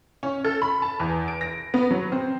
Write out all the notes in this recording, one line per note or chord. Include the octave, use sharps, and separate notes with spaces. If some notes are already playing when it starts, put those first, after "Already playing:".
C#4
A4
B5
A5
E2
D7
A#6
B3
F#3
C4